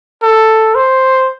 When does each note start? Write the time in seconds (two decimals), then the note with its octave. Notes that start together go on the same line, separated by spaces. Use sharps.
0.23 A4
0.75 C5